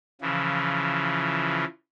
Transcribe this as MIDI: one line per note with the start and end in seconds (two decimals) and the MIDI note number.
0.21 1.64 49
0.21 1.64 52
0.21 1.64 53